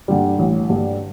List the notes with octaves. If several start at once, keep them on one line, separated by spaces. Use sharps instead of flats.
G2 D3 G3
A1
G2 D3 G3